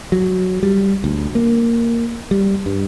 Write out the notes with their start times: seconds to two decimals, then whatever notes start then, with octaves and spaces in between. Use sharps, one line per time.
0.12 F#3
0.63 G3
1.04 D2
1.35 A#3
2.31 G3
2.66 G2